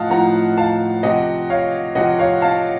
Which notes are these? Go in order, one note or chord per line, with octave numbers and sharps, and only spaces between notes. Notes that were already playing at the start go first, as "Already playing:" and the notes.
Already playing: A2 F3 D#5 F5 F#5 A5
A2 F3 F#5 A#5
F5 A5
C3 F3 D#5 F#5
C#5 F5
C3 F3 D#5 F#5
C#5 F5
F5 A5